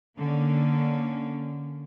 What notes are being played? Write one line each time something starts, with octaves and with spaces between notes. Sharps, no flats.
D3 A#3 C#4